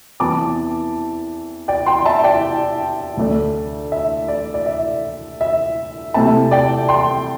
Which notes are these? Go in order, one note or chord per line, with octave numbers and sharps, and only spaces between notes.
E2 E3 C4 E4 A5 D6
D5 G5
G5 C6
E5 A5
D5 G5
D2 D3 A3 D4
E5
D5
D5
E5
E5
C3 A3 C4 E4 E5 A5
D5 G5
G5 C6